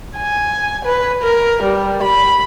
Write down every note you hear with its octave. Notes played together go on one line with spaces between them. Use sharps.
G#5
B4
A#4
G3
B5